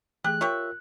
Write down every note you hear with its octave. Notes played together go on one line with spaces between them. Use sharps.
E3 A3 G4 G#4 F#6
F4 G4 A#4 C#5 E5